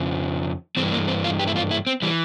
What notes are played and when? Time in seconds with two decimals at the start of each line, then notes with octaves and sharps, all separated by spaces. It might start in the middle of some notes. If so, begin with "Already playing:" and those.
Already playing: F2 C#3 F3
0.77 G2 E3 C4
0.92 A#3
1.08 C4
1.24 F4
1.39 G4
1.47 E4
1.56 F4
1.71 E4
1.87 C4
2.02 E3 G3